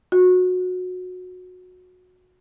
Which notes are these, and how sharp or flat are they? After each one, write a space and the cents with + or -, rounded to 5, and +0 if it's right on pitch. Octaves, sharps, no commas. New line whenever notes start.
F#4 -20